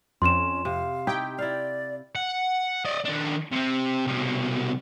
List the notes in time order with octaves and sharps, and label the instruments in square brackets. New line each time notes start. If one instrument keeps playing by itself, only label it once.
[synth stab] F2 [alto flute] C#4 [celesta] C6 E7
[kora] C3 [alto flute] F5
[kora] D#4 E4 G4 [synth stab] G5
[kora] E4 F5 [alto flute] D5
[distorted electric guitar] F#5
D5 D#5
D#3 D4
C3 C4
C2 B2